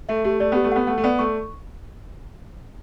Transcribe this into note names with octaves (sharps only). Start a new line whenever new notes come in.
A3 E5
A3 G4
A3 D5
B3 G4
A3
B3 F#5
A3 F#5
A3
B3 D5
A3 C#6